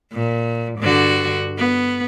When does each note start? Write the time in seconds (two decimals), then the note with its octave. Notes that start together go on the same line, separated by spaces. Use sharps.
0.13 A#2
0.80 G2 D3 F#4
1.58 B3